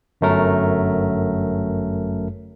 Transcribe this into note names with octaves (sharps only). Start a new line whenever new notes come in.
G1 F#2 F#3 A3 A#4